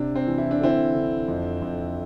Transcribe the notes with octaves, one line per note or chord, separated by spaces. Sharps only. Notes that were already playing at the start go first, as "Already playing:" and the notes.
Already playing: C3 D4
C4
E3
E4
D4
D3 C4 E4
D3
F2
F2